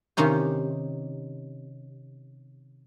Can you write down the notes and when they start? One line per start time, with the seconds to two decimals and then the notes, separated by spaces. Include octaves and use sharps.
0.17 C3 D#3 C#4 D#4 G4